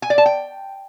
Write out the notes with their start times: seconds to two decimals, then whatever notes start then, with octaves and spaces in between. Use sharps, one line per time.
0.02 G#5
0.10 D5
0.18 A5
0.26 G5